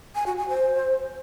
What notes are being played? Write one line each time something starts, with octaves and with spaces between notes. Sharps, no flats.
G#5
F#4
G#5
C5